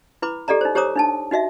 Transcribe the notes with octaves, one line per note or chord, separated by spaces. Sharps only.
E4 B4 B5 D6
G4 A4 D5 D#5 A#5
D#4 C5
G4 C5 C#5 A#5 D6 D#6
D4 D#4 A5
D#4 F#4 D#5 E5